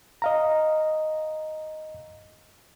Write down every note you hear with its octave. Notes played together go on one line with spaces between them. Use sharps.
D#5 F5 A#5